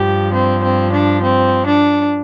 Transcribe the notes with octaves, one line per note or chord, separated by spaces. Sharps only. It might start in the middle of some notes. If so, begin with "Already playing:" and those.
Already playing: G2 F3 G4
C4
C4
D4
C4
D4